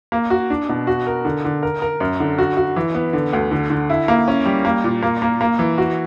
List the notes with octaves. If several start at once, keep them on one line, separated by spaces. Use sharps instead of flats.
A#3
F#4
D4
B2
F#4
A#4
D3
D3
A#4
A#4
F#2
D3
F#4
F#4
E3
B3
D3
D2
D3
D3
E4
A#3
C#4
G3
A#3
A#2
A#3
A#3
A#3
E3
F#4